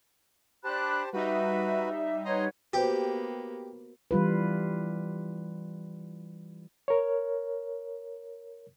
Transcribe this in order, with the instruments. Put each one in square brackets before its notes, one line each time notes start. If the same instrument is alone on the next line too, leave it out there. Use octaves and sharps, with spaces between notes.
[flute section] D4 B5 F#6 [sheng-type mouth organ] G4 C5 A5
[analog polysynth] G3 D#4 [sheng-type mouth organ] F#4 B4 [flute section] E5
[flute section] B4 C#5 F#5 [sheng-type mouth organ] D#5 A#5 C6
[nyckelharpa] A#3 B3 [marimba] F#4 B4 C5 [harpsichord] G4
[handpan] E3 G3 F4 B4
[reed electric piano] A#4 C#5